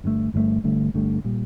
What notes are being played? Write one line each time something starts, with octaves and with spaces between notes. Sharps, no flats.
G1 G2 D3 A3
G1 G2 D3 A3
G1 G2 D3 A3
G1 G2 D3 A3
A#2 G3